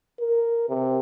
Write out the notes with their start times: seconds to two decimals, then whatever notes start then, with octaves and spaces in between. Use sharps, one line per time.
0.20 A#4
0.69 C3